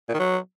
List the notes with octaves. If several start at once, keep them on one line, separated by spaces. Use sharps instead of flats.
A#2
D#3
F#3